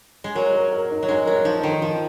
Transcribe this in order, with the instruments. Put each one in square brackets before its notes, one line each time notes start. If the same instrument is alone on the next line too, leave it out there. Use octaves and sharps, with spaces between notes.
[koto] G#3
[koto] F#3 [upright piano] A#4
[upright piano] A#4
A#4
D#4
[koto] F#3
[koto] G#3 [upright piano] D#4
[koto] F#3 [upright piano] A#4
[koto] F3 [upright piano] D#4
[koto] D#3 [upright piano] D#5
[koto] F3 [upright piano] F4